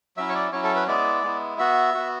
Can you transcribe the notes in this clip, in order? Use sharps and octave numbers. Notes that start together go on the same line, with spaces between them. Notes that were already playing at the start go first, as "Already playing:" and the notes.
F#3 C#4 E4 E5
C#5
D5
F#3 C#4 E4 C#5
A4
B4
G#3 B3 E4 D5
G#3 B3 E4
B3 F#4 E5
B3 F#4